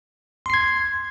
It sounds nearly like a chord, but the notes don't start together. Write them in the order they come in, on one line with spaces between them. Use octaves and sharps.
C6 C7 G#6